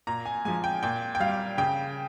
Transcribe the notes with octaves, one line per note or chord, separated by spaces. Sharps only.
A#2 A#5
G#5
F3 G#3 G#5
G5
A#2 G5
G5
G3 F5
C#3 G5